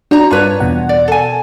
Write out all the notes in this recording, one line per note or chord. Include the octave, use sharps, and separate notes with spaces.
D4 F#4 C5 D5 A#5
G2 F4 B4 C#5 D5 A5
E2 B2 F#5
D5
A4 G#5